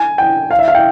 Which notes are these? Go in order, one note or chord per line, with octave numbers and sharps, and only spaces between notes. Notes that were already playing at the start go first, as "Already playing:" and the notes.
Already playing: G#5
G5
F5
E5
F5
G5